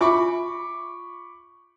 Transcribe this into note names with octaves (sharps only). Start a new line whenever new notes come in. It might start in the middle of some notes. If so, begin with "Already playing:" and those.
F4 E5 G#5 B5 C#6 D6